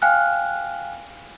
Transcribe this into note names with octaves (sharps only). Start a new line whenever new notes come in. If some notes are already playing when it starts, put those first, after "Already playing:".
F5 G5 G#5 F6 F#6